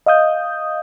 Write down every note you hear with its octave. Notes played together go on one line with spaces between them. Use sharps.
D#5 F5 D#6 G6